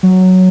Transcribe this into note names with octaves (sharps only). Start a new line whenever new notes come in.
F#3